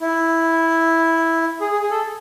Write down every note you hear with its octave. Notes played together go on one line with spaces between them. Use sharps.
E4
G#4
G#4
G#4
A4